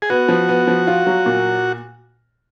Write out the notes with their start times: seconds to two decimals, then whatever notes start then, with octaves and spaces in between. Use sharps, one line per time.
0.02 G#4
0.10 B3 F#4
0.29 F3
0.48 B3
0.67 F3
0.87 F4
1.06 F#3
1.26 A#2